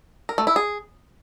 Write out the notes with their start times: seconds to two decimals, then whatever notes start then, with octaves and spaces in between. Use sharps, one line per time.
0.29 A#4
0.38 A3
0.47 E4
0.56 G#4